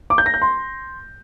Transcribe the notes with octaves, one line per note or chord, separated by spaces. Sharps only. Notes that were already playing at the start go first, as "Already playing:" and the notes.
D6
G6
A#6
G6
C6